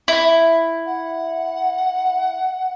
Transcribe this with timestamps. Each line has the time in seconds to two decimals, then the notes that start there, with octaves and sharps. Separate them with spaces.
0.08 E4
0.86 F#5